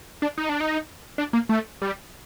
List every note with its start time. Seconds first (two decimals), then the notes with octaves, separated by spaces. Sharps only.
0.22 D4
0.38 D#4
0.49 D4
0.60 D#4
1.18 D4
1.33 A#3
1.49 A3
1.82 G3